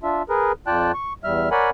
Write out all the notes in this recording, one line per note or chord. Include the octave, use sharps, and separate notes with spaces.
D4 F4 E5
G#4 A#4 B4
F2 F4 D5 G5 A5 F#6
C#6
E2 G3 E5 F6
A#4 C#5 D5 F#5 G#5 B5